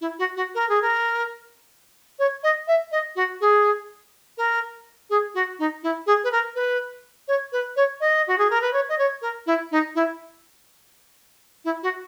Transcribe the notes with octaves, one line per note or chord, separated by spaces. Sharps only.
E4
F#4
F#4
A#4
G#4
A#4
C#5
D#5
E5
D#5
F#4
G#4
A#4
G#4
F#4
D#4
E4
G#4
B4
A#4
B4
C#5
B4
C#5
D#5
F#4
G#4
A#4
B4
C#5
D#5
C#5
A#4
E4
D#4
E4
E4
F#4